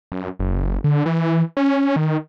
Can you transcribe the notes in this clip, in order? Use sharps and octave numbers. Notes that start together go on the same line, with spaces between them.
F#2
F#1
D3
E3
C#4
D#3